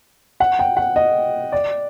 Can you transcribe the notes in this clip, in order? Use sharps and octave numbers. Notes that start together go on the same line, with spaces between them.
F#5
G5
F#5
D#5
D5